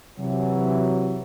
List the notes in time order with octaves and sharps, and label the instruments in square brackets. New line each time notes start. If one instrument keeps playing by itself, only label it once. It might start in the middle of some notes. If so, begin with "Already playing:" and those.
[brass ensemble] C3 E3 F#3